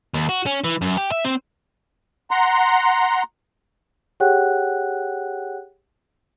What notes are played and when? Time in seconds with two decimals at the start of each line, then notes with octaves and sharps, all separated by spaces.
0.14 D#2
0.29 F#4
0.46 C#4
0.64 E3
0.81 F#2
0.97 G4
1.11 E5
1.25 C4
2.31 F#5 A#5 C6
4.20 G4 G#4 C#5 F#5 G5 F#6